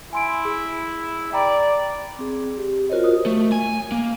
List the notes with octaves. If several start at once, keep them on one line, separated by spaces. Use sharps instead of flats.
E4 G#5 C6 D7
G#4
D5 G5 A#5 B5
C4 G#4
G4
F4 F#4 A#4 C5 C#5 D#5
F#4 A#4 D#6
A3
G#5
A#3